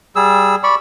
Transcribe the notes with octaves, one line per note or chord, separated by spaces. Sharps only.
G3 G#4 E6
D5 B5 C#6